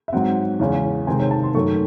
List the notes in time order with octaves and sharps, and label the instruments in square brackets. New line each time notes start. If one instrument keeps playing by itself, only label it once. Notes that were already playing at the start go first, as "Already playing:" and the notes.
[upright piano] E5
G#2 F#3 C4 F#5
E2 C#3 G#3 C#4
C3 D#3 G#3 C4 G#5
C#5
A5
C6
F#2 D#3 A3 C#6